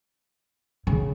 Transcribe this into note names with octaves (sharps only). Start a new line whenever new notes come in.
C#3